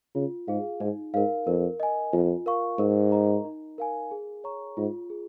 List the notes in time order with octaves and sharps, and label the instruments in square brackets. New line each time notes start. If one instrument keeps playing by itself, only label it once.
[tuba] C#3 [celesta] F4
[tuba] G#2 [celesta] G#4 F5
[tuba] G#2 [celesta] D#4
[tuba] G#2 [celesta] A#4 F5
[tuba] F2 [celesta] A#4
[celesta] D#5 G#5
[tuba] F2 [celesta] F4
[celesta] A#4 F5 C#6
[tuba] G#2 [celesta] A#4
[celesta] D#5 A#5
D#4
A#4 F5 G#5
G#4
C#5 A#5 C#6
[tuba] G#2 [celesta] F4
[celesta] G#4